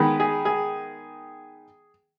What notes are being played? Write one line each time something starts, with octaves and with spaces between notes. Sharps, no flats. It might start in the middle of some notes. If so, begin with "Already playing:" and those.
Already playing: D#3 G#3 B3
G#4
G#4